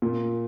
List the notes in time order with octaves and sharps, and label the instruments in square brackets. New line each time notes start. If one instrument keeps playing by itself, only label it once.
[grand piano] A#2